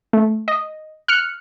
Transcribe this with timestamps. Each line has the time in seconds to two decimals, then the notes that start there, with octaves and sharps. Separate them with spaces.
0.13 A3
0.48 D#5
1.08 F6 F#6 C#7